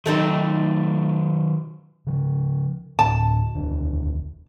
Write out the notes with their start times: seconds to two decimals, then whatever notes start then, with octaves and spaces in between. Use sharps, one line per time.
0.06 D#3 F#3 A3 C4 D#4
2.07 C#3 F3
2.99 D2 A2 A5
3.55 E1 D2 D4